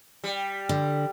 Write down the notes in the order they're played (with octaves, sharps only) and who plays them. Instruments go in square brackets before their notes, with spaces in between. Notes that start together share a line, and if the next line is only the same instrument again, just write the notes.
[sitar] G3
[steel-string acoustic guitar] D3